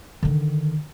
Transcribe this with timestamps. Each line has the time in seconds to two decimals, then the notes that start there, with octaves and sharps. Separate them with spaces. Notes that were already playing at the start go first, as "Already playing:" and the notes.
0.23 D3 D#3